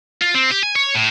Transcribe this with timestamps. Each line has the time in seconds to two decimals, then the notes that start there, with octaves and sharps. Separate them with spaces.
0.22 F4
0.34 C4
0.51 G4
0.63 G#5
0.76 C#5
0.95 A2